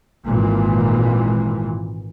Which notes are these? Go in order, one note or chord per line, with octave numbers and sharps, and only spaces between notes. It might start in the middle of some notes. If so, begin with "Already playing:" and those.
G#1 A#2 E3